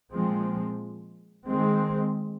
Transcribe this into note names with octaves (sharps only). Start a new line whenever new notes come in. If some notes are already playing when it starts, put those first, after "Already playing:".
A#2 F3 G#3 C4
D#3 G#3 C4